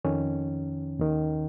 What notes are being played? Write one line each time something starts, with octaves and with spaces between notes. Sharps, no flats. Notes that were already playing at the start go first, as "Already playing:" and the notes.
F2 D#3 C#4
D#2 D#3